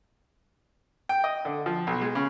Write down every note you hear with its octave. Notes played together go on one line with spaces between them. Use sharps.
G5
D#5
D3
F3
B1
G#3
C#3